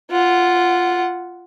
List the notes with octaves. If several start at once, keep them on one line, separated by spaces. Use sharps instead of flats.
F4 F#5